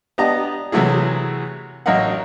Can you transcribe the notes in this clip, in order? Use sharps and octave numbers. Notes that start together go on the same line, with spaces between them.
B3 D4 G4 D#5 A5 A#5
C3 E3 F#3 A3 E4 G#4
A1 F#3 A#4 D#5 F5 F#5